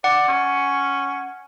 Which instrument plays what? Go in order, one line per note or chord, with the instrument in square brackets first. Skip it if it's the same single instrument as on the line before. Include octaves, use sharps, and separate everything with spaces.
[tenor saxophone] D5 [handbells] F#5
[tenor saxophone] C#4